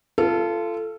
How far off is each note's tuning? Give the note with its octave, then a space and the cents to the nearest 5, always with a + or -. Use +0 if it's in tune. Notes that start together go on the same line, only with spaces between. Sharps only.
F4 -25 A4 +0